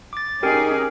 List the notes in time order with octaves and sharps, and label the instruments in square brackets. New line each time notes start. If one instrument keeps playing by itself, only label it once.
[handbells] D6 A6
[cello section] C#4 D#4 G#4 [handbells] G4 A#4 G5